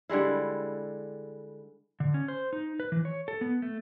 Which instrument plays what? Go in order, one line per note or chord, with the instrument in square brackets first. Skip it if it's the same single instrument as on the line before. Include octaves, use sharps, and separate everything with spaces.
[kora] D3 G3 G#3 E4
[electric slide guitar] D3
C#4
C5
D#4
B4
E3
C#5
A4
B3
A3